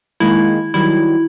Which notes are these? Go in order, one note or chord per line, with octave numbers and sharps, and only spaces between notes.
D#3 G#3 A#3 E4
D#3 F#3 G3 E4